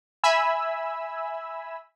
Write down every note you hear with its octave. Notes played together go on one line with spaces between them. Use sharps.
E5 G#5 B5 E6